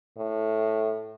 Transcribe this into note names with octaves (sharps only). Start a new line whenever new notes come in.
A2